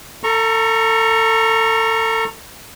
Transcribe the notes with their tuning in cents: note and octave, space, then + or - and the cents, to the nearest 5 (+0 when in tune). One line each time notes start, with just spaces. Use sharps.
A4 +30 A#5 +0 C#6 -15